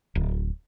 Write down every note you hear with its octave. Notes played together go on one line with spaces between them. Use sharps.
D1